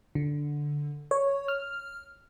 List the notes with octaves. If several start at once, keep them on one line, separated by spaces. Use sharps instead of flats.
D3
C#5
F6